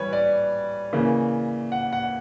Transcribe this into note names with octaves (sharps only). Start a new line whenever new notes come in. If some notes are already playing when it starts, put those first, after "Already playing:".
Already playing: E3 G3 B4 C#5
D5
C#3 E3 A#3
F#5
F#5